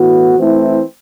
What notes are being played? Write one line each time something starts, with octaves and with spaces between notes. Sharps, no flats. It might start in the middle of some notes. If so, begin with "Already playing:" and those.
Already playing: A2 E3 B3 F#4
E3 A3 C4 E4